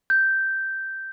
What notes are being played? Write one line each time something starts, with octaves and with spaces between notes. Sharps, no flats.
G6